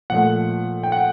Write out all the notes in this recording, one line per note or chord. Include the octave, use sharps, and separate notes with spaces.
A#2 F3 A3 F#5
G5
F#5